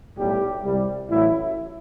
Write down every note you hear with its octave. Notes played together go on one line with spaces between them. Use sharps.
B1 A2 G3 G4
C2 C3 G3
A1 A2 F#3 E4